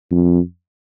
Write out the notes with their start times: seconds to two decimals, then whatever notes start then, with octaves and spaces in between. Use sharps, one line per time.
0.11 F2